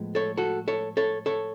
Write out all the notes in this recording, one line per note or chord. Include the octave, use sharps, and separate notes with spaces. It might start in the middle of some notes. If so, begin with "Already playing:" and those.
Already playing: A2 F3 G#3 B3
A4 C#5
F#4 A4
A4 C#5
A4 C#5
A4 C#5